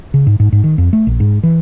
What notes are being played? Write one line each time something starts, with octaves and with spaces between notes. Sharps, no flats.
C#3
G#2
G#2
G#2
D#3
F2
A3
A#1
G#2
E3